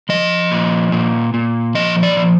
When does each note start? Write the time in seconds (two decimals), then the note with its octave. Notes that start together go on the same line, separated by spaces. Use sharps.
0.09 F3 D#5
0.51 A#2
0.92 A#2
1.34 A#2
1.75 F3 D#5
2.03 D5
2.17 F3